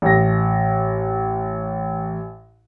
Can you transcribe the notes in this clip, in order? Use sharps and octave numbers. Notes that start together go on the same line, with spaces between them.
A1 A#6